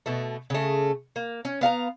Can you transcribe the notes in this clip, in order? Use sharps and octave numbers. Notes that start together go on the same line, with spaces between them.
B2 A3
C#3 A3
A#3
C#4
B3 F5 F#5 A#5